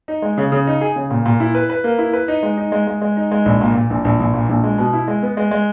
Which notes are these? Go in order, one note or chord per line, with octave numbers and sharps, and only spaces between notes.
D#4
G#3
C#3
C#3
D#4
G#4
C#3
A#2
A#2
E4
B4
B4
A#3
E4
B4
D#4
G#3
D#4
G#3
G#3
G#3
D#4
G#3
A#1
A#2
A#2
A#1
A#1
A#1
A#2
A#1
G#3
B2
E4
G#3
B3
G#3
G#3